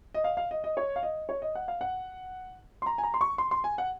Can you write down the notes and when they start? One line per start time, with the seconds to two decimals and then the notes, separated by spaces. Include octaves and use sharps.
0.14 D#5
0.24 F5
0.37 F5
0.51 D#5
0.64 D#5
0.77 C#5
0.96 F5
1.03 D#5
1.29 C#5
1.42 D#5
1.55 F#5
1.68 F5
1.81 F#5
2.82 C6
2.86 A#5
2.98 G#5
3.03 A#5
3.14 C6
3.21 C#6
3.38 C6
3.51 C6
3.64 G#5
3.78 F#5